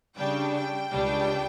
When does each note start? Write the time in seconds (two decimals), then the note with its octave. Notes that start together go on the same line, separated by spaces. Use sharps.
0.17 C#3 G3 D4 G5
0.54 G5
0.91 C#2 C#3 G3 D4